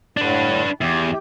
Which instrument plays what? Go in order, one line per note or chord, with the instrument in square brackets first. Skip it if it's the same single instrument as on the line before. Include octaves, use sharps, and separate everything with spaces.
[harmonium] A2 D3 [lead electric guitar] D4 B4
[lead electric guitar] E2 [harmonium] G4